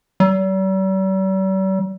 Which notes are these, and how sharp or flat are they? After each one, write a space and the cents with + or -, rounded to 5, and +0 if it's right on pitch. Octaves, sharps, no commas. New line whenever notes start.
G3 -45